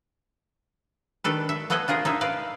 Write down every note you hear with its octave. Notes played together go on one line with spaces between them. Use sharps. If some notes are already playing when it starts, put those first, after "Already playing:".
D#3 D4 A4 B4
E5
A3 B3 A4 D#5 F#5 G#5
D4 F4 G#4 A#4
D#4 E4 E5
B4 D5 F5